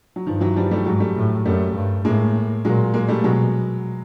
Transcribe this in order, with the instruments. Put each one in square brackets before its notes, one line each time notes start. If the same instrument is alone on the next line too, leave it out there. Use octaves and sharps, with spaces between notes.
[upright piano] F#3
[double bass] G2 [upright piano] D#3 F3
[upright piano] E3 F#3
F3 G3
G3 A3
[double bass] G#2 [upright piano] F#3 G#3
[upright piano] G3 A3
[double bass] A2
[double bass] F#2 [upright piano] G3 A3
[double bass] G2
[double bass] A2 [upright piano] G#3 A#3
[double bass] A#2 [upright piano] F#3 G#3
[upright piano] G#3 A#3
G3 A3
[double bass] B2 [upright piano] F#3 G#3